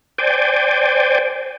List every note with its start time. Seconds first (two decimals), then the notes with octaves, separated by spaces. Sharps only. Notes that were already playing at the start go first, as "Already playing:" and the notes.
0.18 C5 D5 G5 G#5